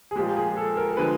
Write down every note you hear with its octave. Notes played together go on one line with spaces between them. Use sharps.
G#4
A#2 F3 G#3 G4
G#4
A4
A#4
A#4
D3 F3 G#3 B4